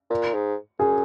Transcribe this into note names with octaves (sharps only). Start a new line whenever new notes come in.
A#2
G#2
F#2 G#4